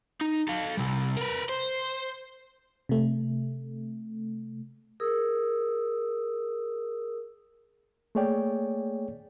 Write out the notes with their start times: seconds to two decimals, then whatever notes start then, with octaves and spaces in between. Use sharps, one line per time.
0.21 D#4
0.48 A4 F5
0.77 C3 G3
1.17 A#4 B4
1.49 C5
2.89 C3 A3
5.00 G#4 A#4 D#6 E6
8.15 A3 A#3 G#4 C#5 D5 G5